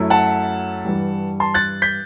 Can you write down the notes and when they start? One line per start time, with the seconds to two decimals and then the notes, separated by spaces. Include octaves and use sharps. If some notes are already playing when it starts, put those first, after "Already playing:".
Already playing: F#2 F#3 A3 E4
0.10 F#5 A5
0.85 G2 E3 G3
1.40 A5 C6
1.54 F#6 A6
1.82 G6 B6